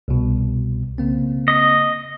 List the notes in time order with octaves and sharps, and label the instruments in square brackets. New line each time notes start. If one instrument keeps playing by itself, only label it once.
[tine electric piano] C2 B2
C#3 A#3 C4
[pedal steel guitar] D#5